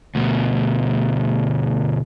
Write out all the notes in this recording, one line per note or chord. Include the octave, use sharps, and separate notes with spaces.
D2 B2